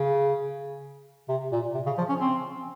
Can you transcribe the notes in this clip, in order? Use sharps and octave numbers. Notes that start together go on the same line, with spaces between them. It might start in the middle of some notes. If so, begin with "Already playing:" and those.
Already playing: C#3
C3
A#2
C3
C#3
F3
C#4
C4